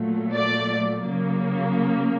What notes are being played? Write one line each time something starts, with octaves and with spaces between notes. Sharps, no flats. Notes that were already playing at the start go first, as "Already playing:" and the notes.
Already playing: A#2 F#3 A3
D5
C#3 F#3 A#3